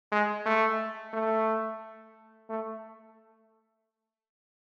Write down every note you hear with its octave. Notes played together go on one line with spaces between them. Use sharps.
G#3
A3
A3
A3